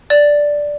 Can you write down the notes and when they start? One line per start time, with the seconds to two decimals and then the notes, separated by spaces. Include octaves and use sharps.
0.10 D5